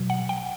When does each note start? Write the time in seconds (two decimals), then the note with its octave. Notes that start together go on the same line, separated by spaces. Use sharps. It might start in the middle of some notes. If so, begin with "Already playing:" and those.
Already playing: B2 F#3
0.10 F#5
0.29 G5